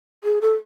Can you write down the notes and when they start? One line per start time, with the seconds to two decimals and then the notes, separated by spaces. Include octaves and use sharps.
0.24 G#4
0.41 A4